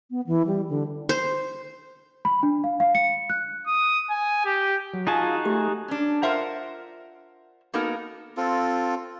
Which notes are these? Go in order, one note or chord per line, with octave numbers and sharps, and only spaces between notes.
B3
E3
G3
D3
C5
B5
D4
F5
F5
C#7
F#6
D#6
G#5
G4
F#3
D#4 F4 F#4 G#4 A5
A3 G4
C#4 D4
F4 A#4 C5 E5 F#5
A#3 B3 D#4 F#4 A4 A#4
C4 F4 A4